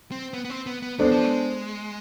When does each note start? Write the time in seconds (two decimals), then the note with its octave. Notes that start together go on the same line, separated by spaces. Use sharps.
0.12 C4
0.33 B3
0.45 B3
0.50 C4
0.66 B3
0.83 B3
0.99 G#3 B3 D4 A4 C5
1.11 F3
1.24 G#3